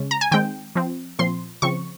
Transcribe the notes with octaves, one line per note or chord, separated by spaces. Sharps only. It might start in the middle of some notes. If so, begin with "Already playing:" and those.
Already playing: C#3 G#3 C#4
A#5
G#5
D#3 G#3 C4 G5
F3 C4
A#2 F3 C4 C6
C#3 F3 C4 C#6